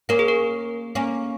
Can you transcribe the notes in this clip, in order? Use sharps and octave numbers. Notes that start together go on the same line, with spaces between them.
A#3 C#4 A#4
G#4
A#4
A#3 C#4